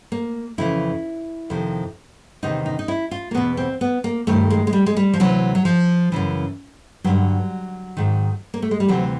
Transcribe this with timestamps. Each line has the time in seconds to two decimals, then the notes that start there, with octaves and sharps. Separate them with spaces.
0.12 A#3
0.58 F2 C#3 E3 E4
1.50 F2 C3 D#3
2.43 E2 C3 D#3 D#4
2.66 D#4
2.79 D#4
2.88 E4
3.11 F4
3.31 A#3
3.35 E2 B2 B3
3.57 C4
3.81 B3
4.04 A#3
4.27 G2 D#3 A3
4.50 G#3
4.67 G#3
4.73 G3
4.86 G#3
4.97 G3
5.13 F3
5.20 D2 C3 E3 F#3
5.55 F#3
5.65 F3
6.12 F#2 C#3 E3
7.04 G2 D3 F#3
7.97 G#2 D#3
8.54 A#3
8.62 A3
8.71 G#3
8.80 G3
8.88 D2 C3 E3 F#3